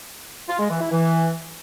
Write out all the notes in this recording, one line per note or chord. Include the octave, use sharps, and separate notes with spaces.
F4
G#3
E3
E4
E3